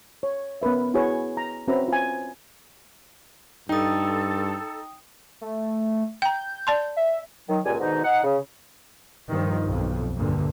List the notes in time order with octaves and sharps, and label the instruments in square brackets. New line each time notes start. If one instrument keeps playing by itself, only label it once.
[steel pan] C#5
B3 C#4 A#4 B4 E5
E4 F#4 G#4 B4 C#5
A#5
C4 C#4 F#4 B4 E5 A#5
F4 G#5
[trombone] G2 [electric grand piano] D#4 [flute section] A4 [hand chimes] G5 D#6
[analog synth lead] A3
[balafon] G5 A#5 [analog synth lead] G6
[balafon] D5 A5 C6
[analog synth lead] E5
[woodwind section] D#3 F#3
C#2 A#2 G3 G#5
G#2 B2 D3 D#3 D#4
D#4 F#5
C#3
[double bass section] G2 D#3 F3
B1 F2
D2 G2 A#2 D3